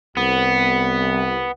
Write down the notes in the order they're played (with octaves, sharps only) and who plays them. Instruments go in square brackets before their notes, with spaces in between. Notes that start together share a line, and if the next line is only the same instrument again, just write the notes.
[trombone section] C2 [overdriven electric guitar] B3